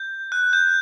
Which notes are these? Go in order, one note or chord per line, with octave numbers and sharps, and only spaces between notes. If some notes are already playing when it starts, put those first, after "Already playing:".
Already playing: G6
F#6
G6